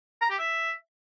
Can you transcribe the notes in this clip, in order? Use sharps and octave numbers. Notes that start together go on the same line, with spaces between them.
A#5
G4
E5